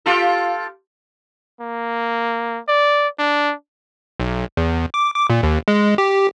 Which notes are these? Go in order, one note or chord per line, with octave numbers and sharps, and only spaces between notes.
F4 G4 A4
A#3
D5
D4
B1
E2
D6
D6
A#2
D#2
G#3
G4